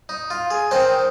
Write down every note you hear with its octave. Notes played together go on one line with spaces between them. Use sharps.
D#4
F4
G#4
D#3 C4 D#4 C5